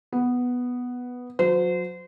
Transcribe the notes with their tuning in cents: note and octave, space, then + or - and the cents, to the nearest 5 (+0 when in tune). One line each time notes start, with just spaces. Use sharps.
B3 +0 B4 +0
F#3 -35 C5 -30